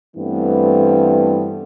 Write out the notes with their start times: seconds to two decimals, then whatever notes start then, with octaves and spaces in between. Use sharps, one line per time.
0.17 G2 E3 A3 B3 C4